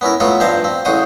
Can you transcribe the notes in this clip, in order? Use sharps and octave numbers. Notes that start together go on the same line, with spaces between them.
B3 C#4 E4 A#4
F#3 A3 B3 F4 F#4
G2 F3 C5 E5 A5 A#5
C4
A1 C#3 F#4 C5 D#6